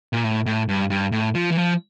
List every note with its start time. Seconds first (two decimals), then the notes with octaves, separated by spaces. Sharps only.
0.13 A#2
0.24 A2
0.46 A2
0.69 G2
0.90 G2
1.12 A2
1.35 F3
1.52 E3
1.57 F3